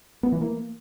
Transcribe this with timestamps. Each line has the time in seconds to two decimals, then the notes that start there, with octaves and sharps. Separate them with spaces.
0.23 B3
0.32 E3
0.41 A#3